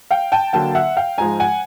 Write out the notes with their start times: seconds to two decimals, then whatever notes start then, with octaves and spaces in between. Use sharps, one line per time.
0.11 F5 G5
0.32 G5 A5
0.53 D3 F#3 A#3 G5 A5
0.75 E5 F#5
0.97 F5 G5
1.18 G#2 F3 G#3 G#5 A#5
1.40 F#5 G#5